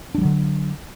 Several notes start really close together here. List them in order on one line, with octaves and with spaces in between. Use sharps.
D4 G3 F#3 D3